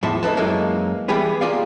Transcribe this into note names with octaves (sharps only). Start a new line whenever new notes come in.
E2 A2 F3 E5 A5
A#3 D#4 A4 B4 A5
F#2 E3 F#3 G#3 A#3 D#4
E3 G3 B3 G4 G#4 B4
A#3 F4 G4 G#4 D5 F5